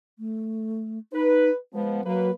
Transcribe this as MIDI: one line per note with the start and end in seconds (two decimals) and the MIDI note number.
0.19 0.99 57
1.13 1.50 63
1.13 1.54 71
1.74 2.02 53
1.74 2.01 56
1.74 2.02 59
2.04 2.31 54
2.04 2.30 58
2.04 2.30 71